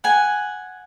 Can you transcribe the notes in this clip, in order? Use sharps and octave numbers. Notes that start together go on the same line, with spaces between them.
F#5 G#5